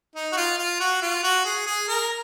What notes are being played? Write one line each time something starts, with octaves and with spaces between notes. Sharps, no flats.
D#4
F#4
F4
F4
F#4
F4
F#4
G#4
G#4
A#4